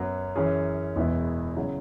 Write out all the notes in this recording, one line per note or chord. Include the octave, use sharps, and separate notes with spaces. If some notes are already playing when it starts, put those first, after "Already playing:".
Already playing: F#2 F#3 B3
F#2 E3 C#4 G#4
E1 E2 E3 B3 E4
C#3 F#3 E4 G#4